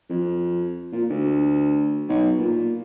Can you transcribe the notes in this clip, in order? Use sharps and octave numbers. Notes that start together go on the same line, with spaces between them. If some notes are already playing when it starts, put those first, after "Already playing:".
F2
A#2
D2
B1
A#2